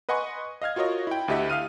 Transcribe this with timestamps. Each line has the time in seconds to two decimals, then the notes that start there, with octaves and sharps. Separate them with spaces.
0.09 B4 D#5 F#5 G#5 C6 C#6
0.62 D#5 F5 F6 G#6
0.76 F4 F#4 A#4 C#5 D#5
1.07 E4 G5
1.28 D2 E4 G4 D#5 E5 F#5
1.50 F5 D#6 F6 D#7